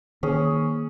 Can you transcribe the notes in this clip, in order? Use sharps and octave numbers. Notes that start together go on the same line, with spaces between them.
D#3 A#3 C#4 G#4